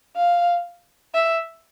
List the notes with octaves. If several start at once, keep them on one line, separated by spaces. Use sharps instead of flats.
F5
E5